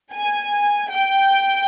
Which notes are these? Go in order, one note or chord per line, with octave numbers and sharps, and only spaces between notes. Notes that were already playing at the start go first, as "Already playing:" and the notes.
G#5
G5